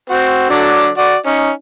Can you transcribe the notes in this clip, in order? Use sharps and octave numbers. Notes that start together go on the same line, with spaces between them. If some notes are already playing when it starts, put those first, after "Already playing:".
C4 F#4
D3 F#3 D5
F#4 D5
C#4 D#4